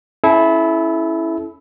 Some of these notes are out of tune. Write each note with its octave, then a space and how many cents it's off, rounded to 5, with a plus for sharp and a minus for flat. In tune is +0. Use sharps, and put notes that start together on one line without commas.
C#4 +0 E4 +0 A4 -35